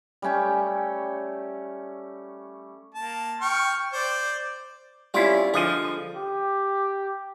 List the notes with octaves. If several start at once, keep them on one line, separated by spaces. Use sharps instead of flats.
G3 A3 C#4 G5
A#3 A5
G5 C#6 F6
C5 D5
G3 C4 C#4 E4 F4 G5
D3 F3 G#4 D#5
G4